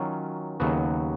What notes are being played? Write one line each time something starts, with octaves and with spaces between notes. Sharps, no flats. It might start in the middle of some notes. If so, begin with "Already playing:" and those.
Already playing: D#3 F#3 C#4 F4
D#2 C#3 F#3 B3 F#4